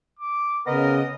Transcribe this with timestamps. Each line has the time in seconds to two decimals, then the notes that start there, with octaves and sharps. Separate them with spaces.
0.20 D6
0.67 C#3 B3 A#4 D#5